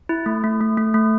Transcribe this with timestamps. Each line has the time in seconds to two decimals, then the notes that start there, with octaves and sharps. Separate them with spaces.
0.09 E4
0.26 A3
0.44 A3
0.61 A3
0.78 A3
0.94 A3